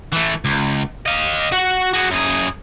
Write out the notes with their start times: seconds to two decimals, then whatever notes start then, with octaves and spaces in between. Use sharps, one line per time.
0.12 E3 A3
0.45 C#2
1.06 D#5 F5
1.52 F#4 F#5
1.94 F#4 G#4
2.11 F#2 G#4